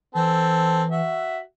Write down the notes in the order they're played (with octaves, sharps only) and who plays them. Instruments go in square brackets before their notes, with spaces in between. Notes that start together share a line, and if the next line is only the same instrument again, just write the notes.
[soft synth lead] E3 [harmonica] C4 A4
[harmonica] F#4 E5